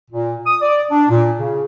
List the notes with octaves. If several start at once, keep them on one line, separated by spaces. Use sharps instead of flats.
A#2
D#6
D5
D4
A#2
C#3